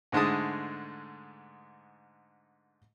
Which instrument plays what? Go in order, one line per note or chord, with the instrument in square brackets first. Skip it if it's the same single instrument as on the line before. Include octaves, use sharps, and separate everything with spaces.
[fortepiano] G#2 D3 G#3 A3 A5 D#6